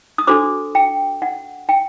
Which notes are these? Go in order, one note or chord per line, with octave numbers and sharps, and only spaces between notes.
D#6
D4 F#4 A4 C5 D6
G5
F#5
G5